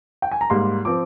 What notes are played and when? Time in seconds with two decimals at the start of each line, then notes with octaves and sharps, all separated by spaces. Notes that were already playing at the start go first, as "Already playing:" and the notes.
0.22 G5
0.32 G#5
0.41 A#5
0.50 G#2 G3 A#3 C6
0.85 F3 C4 D6